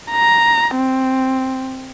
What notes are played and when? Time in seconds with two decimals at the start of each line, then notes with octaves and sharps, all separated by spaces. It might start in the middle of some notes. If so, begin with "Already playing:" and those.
0.12 A#5
0.76 C4